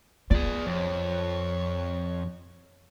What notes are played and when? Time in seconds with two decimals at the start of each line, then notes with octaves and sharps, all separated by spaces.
0.31 F4 G#4 D5
0.66 F2 C#5